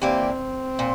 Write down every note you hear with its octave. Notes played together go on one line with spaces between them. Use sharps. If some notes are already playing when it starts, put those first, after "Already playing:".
E3 A#3 C4 D4 G4
A#2